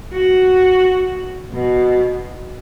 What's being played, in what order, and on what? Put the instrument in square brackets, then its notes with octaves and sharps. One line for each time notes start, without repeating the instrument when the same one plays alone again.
[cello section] F#4
B2